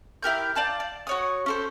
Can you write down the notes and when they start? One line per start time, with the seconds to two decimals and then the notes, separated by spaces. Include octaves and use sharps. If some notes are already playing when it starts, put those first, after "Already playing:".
0.23 E4 G4 A#4 G6
0.55 D5 F5 A5 G6
0.80 D5
1.07 F#4 C#5 D#6
1.46 C#4 A4 C5